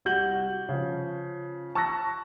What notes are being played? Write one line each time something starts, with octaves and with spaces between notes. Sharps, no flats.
C2 G3 F#4 G6 F#7
C#3 F3
A5 C#6 E6 F#6 A6 A#6